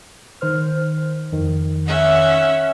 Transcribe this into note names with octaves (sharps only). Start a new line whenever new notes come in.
D#3 C5 F6
F2 D#3
C#4 E5 F#5